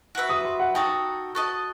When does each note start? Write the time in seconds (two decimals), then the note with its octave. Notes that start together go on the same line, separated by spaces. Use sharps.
0.15 F#4 B4 E5
0.29 D#6
0.45 C6
0.60 F#5
0.75 D#4 F#4 A4 G5
1.35 F#4 A4 D#5